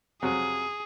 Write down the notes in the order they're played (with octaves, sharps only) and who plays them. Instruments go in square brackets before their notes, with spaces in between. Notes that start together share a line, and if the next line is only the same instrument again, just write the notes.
[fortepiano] F2 C3 F#3 [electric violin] G#4